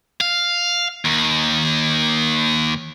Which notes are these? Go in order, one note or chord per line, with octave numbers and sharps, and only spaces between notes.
F5
D#2